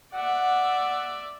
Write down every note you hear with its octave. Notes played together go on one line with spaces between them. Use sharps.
D5 E5 F#5